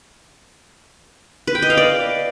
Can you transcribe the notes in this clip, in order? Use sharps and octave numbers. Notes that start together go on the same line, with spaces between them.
B4
G5
D#5
F5
D5